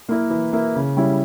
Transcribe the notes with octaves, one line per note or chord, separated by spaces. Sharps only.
A#3 E4 A#4
E3
A#3 E4 A#4
C#3
G3 C#4 E4